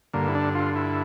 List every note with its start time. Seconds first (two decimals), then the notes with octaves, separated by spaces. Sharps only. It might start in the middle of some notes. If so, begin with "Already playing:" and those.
0.13 G2 D3 A#3
0.28 E4
0.35 D4
0.55 F4
0.76 E4